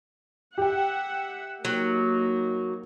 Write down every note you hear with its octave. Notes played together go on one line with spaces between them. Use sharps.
G4 E5 F#5 G5
F#3 A#3 D#4